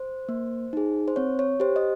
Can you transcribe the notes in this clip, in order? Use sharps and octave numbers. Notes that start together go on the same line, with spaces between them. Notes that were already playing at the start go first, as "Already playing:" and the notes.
Already playing: C5
A#3
D#4 G#4
C5
C4 C#5
C#5
G4 C5
D#5